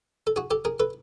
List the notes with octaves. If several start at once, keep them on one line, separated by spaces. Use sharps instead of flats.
A4
F#4 G#4
G4 A4
G#4 A#4
A4 B4